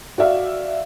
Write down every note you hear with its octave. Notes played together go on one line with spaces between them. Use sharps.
F#4 D5 E5 F5